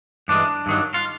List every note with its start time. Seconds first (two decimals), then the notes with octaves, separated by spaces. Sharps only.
0.28 G2 E3 G#3 D4
0.66 G2 D#3 F#3
0.94 F4